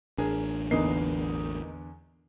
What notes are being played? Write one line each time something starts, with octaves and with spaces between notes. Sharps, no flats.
A1 D4 G#4 A#4
E2 D3 A#3 B3 D#4 C7